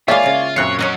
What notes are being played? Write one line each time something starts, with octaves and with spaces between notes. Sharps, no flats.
G#3 A#3 F4 C#5 D5 E5 F5 G#5
C#3 E4
F#2 A#2 C4 F4 C#5 F#6 C7
F#3 C#4 C#5 D#5 F#5